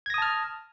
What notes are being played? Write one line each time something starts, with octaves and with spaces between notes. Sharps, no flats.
A5 D#6 F6 G#6 A#6